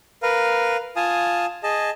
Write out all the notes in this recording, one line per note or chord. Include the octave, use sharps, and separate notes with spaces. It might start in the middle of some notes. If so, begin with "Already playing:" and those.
A#4 B4 F5
F4 F5 G#5 A5 D#6
G#4 D#5 A5